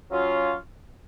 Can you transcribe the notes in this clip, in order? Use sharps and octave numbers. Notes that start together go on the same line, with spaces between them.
F#3 C#4 F4